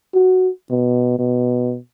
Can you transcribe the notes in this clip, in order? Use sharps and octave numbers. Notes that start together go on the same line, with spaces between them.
F#4
B2
B2